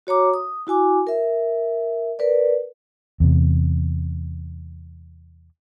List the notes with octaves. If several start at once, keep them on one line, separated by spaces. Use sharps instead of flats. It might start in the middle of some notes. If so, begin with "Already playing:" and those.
F#4 C#5 A#5 D6
D#6
E4 F#4 G#5 D6
A#4 E5
A#4 B4 D5
E2 C3